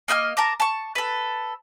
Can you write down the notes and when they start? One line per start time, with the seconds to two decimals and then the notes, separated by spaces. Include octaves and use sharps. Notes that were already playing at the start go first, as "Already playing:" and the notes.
0.08 A#3 D#5 F#5 F6
0.37 A#4 A5 A#5 D6
0.60 A5 C#6
0.95 A4 B4